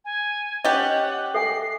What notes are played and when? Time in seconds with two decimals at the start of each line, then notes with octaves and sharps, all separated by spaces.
0.05 G#5
0.65 C#4 G4 D#5 F#5
1.34 A4 E5 G#5 C7